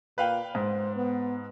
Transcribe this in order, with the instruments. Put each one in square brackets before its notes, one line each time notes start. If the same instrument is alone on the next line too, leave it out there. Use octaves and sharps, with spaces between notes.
[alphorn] A#2 [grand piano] B4 F5 G5
[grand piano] G#2 [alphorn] C5
[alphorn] B3